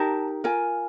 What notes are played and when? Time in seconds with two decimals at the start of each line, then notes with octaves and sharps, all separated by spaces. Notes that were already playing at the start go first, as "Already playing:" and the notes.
Already playing: D#4 G4 A#4 A5
0.44 F4 A#4 G#5